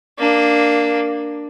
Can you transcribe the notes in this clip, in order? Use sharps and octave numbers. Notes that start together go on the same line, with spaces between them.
A#3 D4